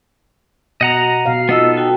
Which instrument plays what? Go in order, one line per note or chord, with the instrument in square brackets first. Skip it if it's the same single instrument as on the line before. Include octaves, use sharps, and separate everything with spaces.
[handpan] B2 [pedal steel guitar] D#5 F#5 A#5
[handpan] B2 F5
[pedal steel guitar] B3 D#4 A4 [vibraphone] F4 D#5 E6
[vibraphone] F#4 G5 A5